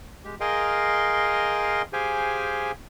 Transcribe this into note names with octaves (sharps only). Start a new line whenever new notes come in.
G#3 G4
G#4 A#4 D#5 F5 G5 C6
G4 G#4 C5 F5 G5 G#5